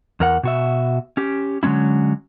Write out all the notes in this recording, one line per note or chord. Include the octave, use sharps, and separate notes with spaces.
E2 A#4 F#5
B2 F#4 E5
C#4 G4
D3 F#3 G#3 C#4 E4